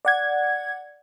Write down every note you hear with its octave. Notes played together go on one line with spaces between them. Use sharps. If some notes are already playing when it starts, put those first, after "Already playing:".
D5 F#5 G#6